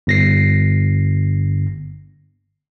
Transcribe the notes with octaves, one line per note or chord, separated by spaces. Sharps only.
G1 A#6 C7